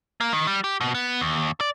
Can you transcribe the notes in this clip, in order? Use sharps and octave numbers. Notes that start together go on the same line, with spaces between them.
A#3
D#3
G3
G4
B2
B3
D#2
D5